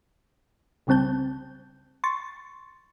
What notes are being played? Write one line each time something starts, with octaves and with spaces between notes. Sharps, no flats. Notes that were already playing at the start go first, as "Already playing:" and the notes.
C2 C#3 G3 C4 A5 G6
C6 C#6 A6